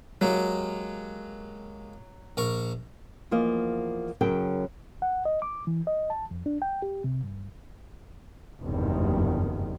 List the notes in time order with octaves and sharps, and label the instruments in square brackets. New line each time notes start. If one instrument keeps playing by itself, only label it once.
[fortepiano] F#3 [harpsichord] G#3 A#3 G4
[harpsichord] A#1 A#4 C#6
[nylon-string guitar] E2 F3 A#3 D#5 F5
F#2 C#3 F#3 A#4 G5
[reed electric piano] F#5
D#5
D6
E3
D#5
A5
F2
D4
G5
G4
C3
G2
[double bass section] F#1 E2 G2 C3 D#3